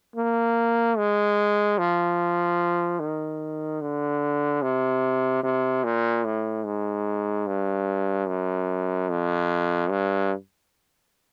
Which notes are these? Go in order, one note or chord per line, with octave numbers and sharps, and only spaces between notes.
A#3
G#3
F3
D#3
D3
C3
C3
A#2
A2
G#2
G2
F#2
F2
G2